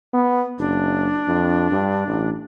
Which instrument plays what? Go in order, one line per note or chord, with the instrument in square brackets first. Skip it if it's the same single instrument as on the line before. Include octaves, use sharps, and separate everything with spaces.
[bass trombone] B3
[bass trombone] F#1 [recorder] D4
[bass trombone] F2
G2
A1